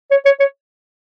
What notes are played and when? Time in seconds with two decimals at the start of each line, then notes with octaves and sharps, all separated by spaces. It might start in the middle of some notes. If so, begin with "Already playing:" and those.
0.11 C#5
0.25 C#5
0.40 C#5